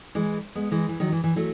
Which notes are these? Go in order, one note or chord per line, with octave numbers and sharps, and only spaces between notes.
E3 G#3
G#3 B3
E3 G#3
E3
D#3 F#3
E3
E3
F#3 A3